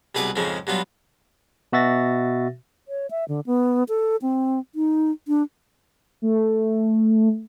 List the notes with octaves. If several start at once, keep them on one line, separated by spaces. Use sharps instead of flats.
C2 B2 G#4 B4 F#5 D6
F2 G#2 C#3 F3 G#3
G2 F#3 B3 F4
B2 F#4 E5 A6 A#6
C#5
E5
D3
B3
A4
C4
D#4
D4
A3